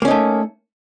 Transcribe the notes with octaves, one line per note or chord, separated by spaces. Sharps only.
A3 A#3 C#4 D#4